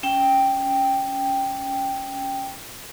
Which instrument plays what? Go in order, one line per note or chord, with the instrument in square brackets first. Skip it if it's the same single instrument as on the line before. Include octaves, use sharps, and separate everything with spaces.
[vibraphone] C#4 G5